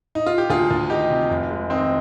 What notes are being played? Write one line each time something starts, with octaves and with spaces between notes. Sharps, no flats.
D#4
F4
G4
D2 F4 G#4
D2
D#3 D#4 G4
C3
F1
G#3
D#3 C4 D#4